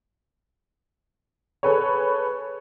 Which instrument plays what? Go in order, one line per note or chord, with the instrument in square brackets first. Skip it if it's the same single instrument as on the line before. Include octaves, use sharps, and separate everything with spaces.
[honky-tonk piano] G#4 A4 B4 C#5